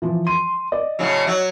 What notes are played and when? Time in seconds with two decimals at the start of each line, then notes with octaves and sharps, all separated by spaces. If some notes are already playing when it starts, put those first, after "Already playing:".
0.02 E3 F3
0.27 C6 D#7
0.72 D5 D#5
0.99 A2 C#3 F#3
1.27 F#3